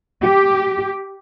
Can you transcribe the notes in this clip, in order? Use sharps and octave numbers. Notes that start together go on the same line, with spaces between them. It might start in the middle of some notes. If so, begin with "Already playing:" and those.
G4